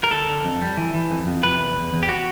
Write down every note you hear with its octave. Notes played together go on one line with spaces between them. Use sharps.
A#4
D3 A4
D3
F2
G3
E3
E3
F2
F2
C3 B4
E2
E2
E2
G4
F#4